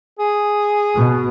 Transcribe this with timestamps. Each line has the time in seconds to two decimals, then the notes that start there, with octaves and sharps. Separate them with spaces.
0.19 G#4
0.96 B2